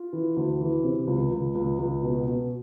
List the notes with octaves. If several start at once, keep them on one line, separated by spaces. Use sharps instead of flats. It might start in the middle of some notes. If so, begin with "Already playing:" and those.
Already playing: F4
E3
D2
E3
C3
C#2
C#2
C#2
C#2
B2
B2